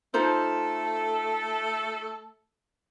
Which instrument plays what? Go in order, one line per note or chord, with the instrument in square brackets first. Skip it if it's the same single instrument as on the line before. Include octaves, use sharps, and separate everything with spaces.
[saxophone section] A3 A4 [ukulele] D#4 F4 C5